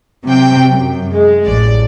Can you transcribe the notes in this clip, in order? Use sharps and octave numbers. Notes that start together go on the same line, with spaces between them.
C3 F#3 G5
F#2
G#3
A1 D5